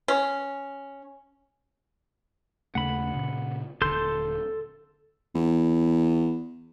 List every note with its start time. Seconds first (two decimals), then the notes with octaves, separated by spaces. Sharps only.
0.08 C#4
2.75 D#2 C#3 A3 F#5 B5
3.14 A#2 C#3
3.82 D#1 D3 A4 C6 G6
5.35 E2